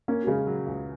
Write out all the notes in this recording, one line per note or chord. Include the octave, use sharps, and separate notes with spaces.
A#3 C#4 A#4
F#4
C#3 G#3 G#4
F#3
C#2